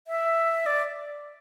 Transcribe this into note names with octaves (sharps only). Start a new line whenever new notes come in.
E5
D5